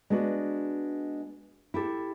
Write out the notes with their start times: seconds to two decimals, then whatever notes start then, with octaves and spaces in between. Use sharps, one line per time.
0.10 G#3 B3 D4 F#4
1.74 E4 G4 A4